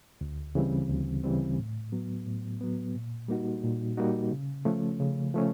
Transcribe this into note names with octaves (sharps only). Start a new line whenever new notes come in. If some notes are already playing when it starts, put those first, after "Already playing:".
D2
C#3 E3 G3 C4
D2
C#3 E3 G3 C4
A2
F#3 B3
A2
F#3 B3
A#2
G3 A#3 D#4 F#4
A#2
G3 A#3 D#4 F#4
C#3
F3 A3 C#4
C#3
F3 A3 C#4